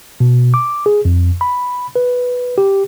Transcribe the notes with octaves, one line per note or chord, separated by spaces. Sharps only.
B2
D6
G#4
F2
B5
B4
G4